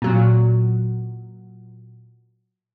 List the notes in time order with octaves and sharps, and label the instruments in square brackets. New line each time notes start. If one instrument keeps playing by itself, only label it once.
[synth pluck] A#2 F#3